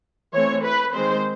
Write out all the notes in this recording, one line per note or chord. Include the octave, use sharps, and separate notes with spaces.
E3 A3 C4 C#5
B4
D#3 G#3 C4 C5